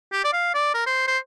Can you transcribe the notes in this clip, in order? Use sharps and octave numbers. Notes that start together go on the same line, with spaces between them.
G4
D5
F5
D5
A#4
C5
C5